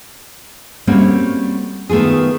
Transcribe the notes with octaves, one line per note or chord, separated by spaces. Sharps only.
G3 A3 A#3 C4 C#4 F#4
D#3 A3 B3 F4 G#4